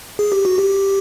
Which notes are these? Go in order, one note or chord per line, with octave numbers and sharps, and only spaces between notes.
G#4
G4
F#4
G4